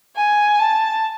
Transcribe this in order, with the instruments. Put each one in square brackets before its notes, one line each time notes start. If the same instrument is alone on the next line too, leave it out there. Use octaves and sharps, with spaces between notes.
[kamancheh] G#5
A5